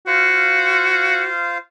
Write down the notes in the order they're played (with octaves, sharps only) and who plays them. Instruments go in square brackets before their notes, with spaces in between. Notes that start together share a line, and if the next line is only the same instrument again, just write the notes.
[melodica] F4 C5 F5 [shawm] F#4